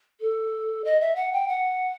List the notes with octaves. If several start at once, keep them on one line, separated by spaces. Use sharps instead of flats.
A4
D#5
E5
F#5
G5
F#5